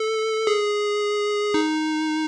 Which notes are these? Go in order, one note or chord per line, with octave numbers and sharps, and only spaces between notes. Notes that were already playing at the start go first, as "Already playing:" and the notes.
Already playing: A4
G#4
D#4